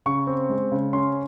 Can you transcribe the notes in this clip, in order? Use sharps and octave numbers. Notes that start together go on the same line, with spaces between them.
C#3 C#6
C4
G#3
C#3
C#4 C6